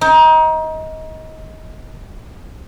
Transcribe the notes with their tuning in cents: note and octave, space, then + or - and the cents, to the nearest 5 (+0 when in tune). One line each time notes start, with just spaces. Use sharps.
D#4 +25